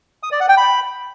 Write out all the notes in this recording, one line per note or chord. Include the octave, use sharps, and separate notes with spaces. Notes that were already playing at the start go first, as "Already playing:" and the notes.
D#6
D5
F#5
G5
B5